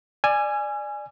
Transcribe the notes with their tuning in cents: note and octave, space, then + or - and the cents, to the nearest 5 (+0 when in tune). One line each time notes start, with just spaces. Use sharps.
D5 +20 G#5 +0 E6 +45